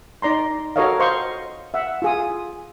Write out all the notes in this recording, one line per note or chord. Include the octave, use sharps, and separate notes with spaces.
D#4 D5 A#5 C6
F#4 A4 A#4 C#5 D#5 F5
C5 D#5 F5 C6 C#6
E5 F#5
F4 G#4 D#6